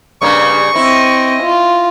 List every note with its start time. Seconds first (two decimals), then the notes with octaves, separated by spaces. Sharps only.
0.22 G2 C#3 A#3 C#6
0.76 C4 E4 D#5
1.43 F4